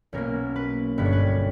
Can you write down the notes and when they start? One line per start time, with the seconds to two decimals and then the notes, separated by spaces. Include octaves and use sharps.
0.13 B1 B2 A#3 C#4 A#4
0.56 B4
0.98 G1 G2 G3 B4
1.05 C#5
1.13 B4